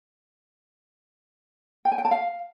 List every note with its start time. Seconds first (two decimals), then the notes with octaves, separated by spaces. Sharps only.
1.85 G5
1.92 G#5
1.98 G5
2.05 A5
2.11 F5